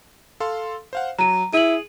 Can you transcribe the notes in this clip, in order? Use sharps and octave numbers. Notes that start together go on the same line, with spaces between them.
A4 F5 C6
C5 F5 F#5
F#3 A#5 D#7
E4 G#4 D#7 F#7